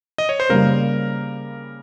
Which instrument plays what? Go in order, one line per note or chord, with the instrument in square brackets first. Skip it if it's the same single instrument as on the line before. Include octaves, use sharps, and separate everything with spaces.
[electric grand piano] D#5
C#5
C5
[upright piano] C#3 G3 A#3 [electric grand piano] A#4